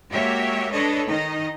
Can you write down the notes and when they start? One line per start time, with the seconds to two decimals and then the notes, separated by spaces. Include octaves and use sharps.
0.11 G#3 A#3 F#4 G4 C#5 E5
0.71 D4 A4 B4 C#5 D#5
1.06 D#3 D#4 D#5